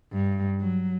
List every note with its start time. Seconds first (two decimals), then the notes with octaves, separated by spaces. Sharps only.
0.12 G2
0.59 F#3